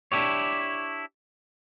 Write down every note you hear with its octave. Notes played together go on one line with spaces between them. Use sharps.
D4 E4 G4 C#5